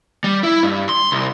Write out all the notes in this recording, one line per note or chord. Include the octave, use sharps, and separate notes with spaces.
G3
E4
G2
C6
C2